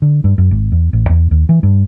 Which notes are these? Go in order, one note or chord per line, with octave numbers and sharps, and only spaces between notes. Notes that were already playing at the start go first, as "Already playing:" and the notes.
D3
G2
F#2
G#1
E2
A1
E2
D#2
E3
G2